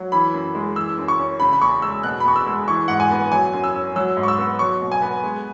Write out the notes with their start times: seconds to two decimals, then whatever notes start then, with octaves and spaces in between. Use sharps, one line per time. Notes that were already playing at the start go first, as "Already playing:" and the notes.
Already playing: F#3
0.12 E3 B5
0.34 F#2
0.55 G#3
0.76 E3 E6
0.98 F#2
1.08 C#6
1.19 C#4
1.40 C#3 B5
1.53 B5
1.62 E2 C#6
1.82 G#3 E6
2.03 B2 F#6
2.20 B5
2.25 E2 C#6
2.36 E6
2.47 G#3
2.68 E3 C#6
2.88 G#2 F#5
3.00 G#5
3.11 B3
3.32 F#3 G#5
3.53 F#2
3.64 E6
3.75 C#4
3.96 F#3 E6
4.17 G#2
4.23 C#6
4.28 E6
4.38 B3
4.59 F#3 C#6
4.81 B2
4.92 G#5
5.02 B3
5.24 G#3